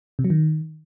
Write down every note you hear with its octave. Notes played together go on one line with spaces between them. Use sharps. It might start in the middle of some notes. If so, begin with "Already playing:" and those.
C3
F#3
D#3